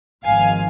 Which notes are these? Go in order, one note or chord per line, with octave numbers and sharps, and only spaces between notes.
G#1 G#2 F3 F5 G#5